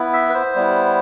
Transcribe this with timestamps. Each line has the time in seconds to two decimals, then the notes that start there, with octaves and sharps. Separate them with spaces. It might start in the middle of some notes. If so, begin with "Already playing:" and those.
Already playing: B3 E4
0.13 E5
0.30 B4
0.34 C5
0.55 G3 B3 E4